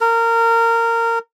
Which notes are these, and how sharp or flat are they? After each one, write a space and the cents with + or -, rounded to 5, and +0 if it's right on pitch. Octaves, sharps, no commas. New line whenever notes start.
A#4 -20